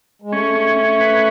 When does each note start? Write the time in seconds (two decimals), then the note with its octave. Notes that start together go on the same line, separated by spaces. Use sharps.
0.22 G#3
0.31 A3 C#4
0.55 C#4
0.78 C#4
1.00 B4